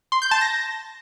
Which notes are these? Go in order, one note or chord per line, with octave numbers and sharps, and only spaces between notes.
C6
G6
A5
A#6